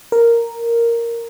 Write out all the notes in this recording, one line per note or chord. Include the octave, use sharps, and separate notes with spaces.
A#4